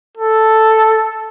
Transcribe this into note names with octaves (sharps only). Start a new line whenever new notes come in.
A4